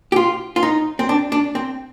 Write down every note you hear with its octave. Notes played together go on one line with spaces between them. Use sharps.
G4
F4
F4
D#4
C4
D4
D4
C4